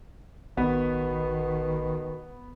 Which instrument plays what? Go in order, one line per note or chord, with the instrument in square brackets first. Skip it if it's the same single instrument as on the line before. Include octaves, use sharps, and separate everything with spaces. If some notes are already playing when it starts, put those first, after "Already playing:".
[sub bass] A1 [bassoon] B2 [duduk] D#3 [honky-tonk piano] B3